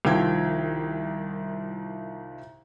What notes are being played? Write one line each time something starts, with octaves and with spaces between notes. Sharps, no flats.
C2 D#3 F3 G5 G#6